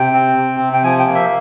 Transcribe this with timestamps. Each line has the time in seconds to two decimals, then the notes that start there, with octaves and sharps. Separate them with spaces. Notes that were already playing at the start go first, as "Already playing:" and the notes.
Already playing: C3 G5
0.13 C4
0.36 C3
0.59 C3
0.73 G5
0.83 F3 G#5
0.99 G5
1.07 A#3
1.14 E5